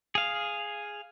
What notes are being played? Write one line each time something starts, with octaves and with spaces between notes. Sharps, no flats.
G#4 F5